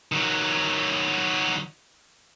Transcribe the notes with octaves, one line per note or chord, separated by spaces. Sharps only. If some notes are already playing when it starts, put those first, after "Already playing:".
D#3 F#3